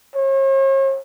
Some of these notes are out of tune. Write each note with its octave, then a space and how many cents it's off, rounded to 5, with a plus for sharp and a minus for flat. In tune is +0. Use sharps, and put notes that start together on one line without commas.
C#5 -45